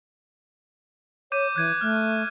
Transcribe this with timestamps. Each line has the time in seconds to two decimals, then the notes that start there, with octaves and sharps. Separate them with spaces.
1.32 C#5 D6 G6 D#7
1.56 E3 F#6 G#6 D#7
1.81 A3 F6 F#6